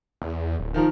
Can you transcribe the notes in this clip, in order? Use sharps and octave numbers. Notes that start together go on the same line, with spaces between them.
E2
D1
D#3 F3 A#4